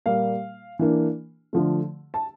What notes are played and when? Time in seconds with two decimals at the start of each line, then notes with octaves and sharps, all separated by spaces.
0.06 A#2 G3 A#3 F5
0.79 E3 A#3 D4
1.53 D3 F3 A3
2.14 A5